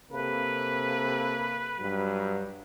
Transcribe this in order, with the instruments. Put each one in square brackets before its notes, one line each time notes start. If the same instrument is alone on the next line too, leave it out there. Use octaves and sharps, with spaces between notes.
[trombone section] C3 A#3 A4 [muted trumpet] B4
[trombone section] G2 F#3